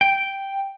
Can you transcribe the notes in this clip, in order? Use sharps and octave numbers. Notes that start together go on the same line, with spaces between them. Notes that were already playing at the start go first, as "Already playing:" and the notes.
G5